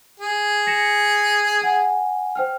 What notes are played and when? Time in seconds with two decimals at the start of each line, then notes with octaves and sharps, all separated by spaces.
0.20 G#4
0.67 A#6 C#7 E7
1.61 F#5 G#5
2.35 C5 G5 F6